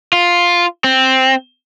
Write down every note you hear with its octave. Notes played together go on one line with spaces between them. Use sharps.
F4
C4